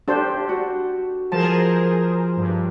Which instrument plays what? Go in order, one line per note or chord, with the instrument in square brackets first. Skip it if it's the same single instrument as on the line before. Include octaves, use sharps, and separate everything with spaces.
[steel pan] D4 G4 C5 [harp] A4
[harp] F#4
[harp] F3 [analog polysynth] G#4 A#4 C5 [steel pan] A5
[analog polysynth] G2